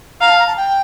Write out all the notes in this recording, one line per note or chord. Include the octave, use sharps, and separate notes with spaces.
F5 A#5
A5
A#5
A5
G5